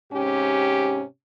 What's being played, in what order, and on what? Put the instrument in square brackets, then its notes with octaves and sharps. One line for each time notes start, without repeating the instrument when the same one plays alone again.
[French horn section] G#2 C3 C#4 G4